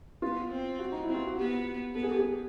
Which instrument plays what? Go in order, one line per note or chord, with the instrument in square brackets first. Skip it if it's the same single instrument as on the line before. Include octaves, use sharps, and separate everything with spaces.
[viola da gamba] B3 [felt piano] F4
[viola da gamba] C4
[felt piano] F#4
D#4
E4
[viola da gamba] C4
[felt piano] F4
F#4
[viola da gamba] B3 [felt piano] G4
[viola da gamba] B3 [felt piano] A4
[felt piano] G#4
G4
G#4